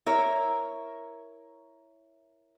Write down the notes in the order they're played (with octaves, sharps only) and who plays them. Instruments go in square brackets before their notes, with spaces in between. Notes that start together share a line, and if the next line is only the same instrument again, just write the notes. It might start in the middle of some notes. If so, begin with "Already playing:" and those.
[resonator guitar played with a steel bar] E4 A#4 C#5